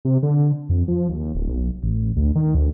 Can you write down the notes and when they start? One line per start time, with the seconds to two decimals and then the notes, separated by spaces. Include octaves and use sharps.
0.05 C3
0.23 D3
0.69 F2
0.88 F3
1.10 D#2
1.35 D1
1.48 B1
1.83 A1
2.16 D2
2.35 D#3
2.55 D2